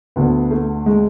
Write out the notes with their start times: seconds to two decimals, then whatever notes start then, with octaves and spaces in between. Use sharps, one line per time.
0.16 D2 D3 B3
0.51 A3
0.86 G#3